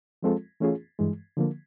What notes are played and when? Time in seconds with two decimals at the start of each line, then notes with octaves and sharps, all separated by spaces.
0.23 F3 G#3 C4 F4 A4
0.60 E3 A3 C#4 F4 G#4
0.99 G2 E3 G#3
1.37 D3 F3 A#3